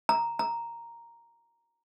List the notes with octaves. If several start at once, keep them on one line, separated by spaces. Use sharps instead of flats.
A#5
A#5